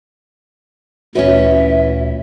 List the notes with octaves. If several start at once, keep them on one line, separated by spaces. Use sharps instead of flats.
D2 A#2 E3 C#4 F#4 C#5 E5